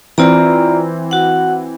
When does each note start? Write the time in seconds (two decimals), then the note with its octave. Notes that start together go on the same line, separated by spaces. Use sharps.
0.18 E3 C4 F4 D5 A#5
1.11 F#4 F#5